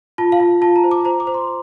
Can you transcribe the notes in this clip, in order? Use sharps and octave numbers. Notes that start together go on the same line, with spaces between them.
F4 A5
F5
F4
F4 A5
A#5
C5
D6
C5 A#5
D6
C5
C6